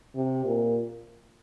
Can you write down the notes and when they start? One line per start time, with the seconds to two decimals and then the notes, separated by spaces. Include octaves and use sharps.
0.15 C3
0.45 A#2